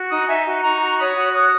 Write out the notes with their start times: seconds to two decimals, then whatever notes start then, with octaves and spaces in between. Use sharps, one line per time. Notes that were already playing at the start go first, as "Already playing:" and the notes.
Already playing: F#4
0.09 D#4 D#6 F#6
0.27 D#4 E5 G#5
0.46 F#4
0.62 D#4 A#5 C#6
0.81 F#4
0.98 C#5 B5 D#6
1.16 F#4
1.33 C#5 D#6 F#6